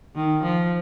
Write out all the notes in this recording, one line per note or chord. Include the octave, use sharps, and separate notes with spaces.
D#3
F3